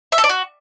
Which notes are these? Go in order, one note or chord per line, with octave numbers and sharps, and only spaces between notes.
E5
A4
D5
F#4